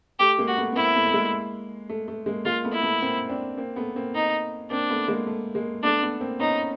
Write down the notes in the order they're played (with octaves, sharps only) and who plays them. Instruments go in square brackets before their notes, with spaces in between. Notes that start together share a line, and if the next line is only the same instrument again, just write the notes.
[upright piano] A3 [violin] G4
[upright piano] G#3 A#3
[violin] F#4
[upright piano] A3 B3
B3
[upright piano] A#3 C4 [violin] E4
[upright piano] A3 B3
A3
G#3 A#3
A3
A3
G#3 A#3
[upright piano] G#3 A#3 [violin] F4
[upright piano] A3 B3
[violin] E4
[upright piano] A3 B3
A#3 C4
C4 D4
A#3 C4
A3 B3
A#3 C4
[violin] D#4
[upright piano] A#3 C4 [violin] D4
[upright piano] A3 B3
G#3 A#3
A3
G#3 A#3
[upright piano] A3 B3 [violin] D4
[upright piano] A3 B3
A#3 C4
[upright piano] B3 C#4 [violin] D#4